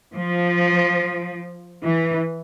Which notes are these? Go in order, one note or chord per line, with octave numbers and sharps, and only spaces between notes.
F3
E3